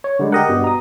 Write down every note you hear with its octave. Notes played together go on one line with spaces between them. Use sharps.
C#5
D3 G3 G#3
G4 A#4 D#5 F#5
G2 B2 G3
A#5 D#6